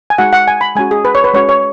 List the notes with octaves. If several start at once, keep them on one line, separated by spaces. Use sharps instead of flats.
G#5
G#3 D#4 F#4 F#5
F#5
G#5
B5
G#3 C#4 F#4 G#5
G#4
B4
C#5
B4
G#3 C#4 F#4 C#5
C#5